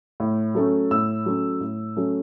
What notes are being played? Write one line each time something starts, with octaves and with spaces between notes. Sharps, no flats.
A2
F#3 A3 C#4
A2 E6
F#3 A3 C#4
A2
F#3 A3 C#4